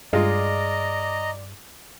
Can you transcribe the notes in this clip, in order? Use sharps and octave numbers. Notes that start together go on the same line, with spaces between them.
G2 G#3 F4 D5 D#5 A#5